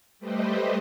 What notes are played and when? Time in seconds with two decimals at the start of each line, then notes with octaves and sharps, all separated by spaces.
0.19 G3 A3 G4 B4 C5 D#5